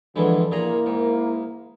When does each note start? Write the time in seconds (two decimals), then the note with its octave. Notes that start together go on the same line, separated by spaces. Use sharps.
0.16 F2 D3 E3 G#3
0.51 A#2 A#3 E4 G#4 A#4 A#5
0.86 G#2